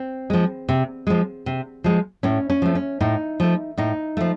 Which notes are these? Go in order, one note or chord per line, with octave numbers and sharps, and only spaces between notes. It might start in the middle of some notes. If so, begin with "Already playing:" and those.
Already playing: C4
F3 G#3
C3
F3 G#3
C3
F3 G#3
A2 C#4
C#4
F3 A3
C#4
A2 D#4
F3 A3
A2 D#4
F3 A3